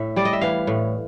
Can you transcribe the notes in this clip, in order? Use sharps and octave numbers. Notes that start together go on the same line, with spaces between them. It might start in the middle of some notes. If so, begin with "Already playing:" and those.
Already playing: A2 E5
G3 D5
D#5
E5
E3 F5
A2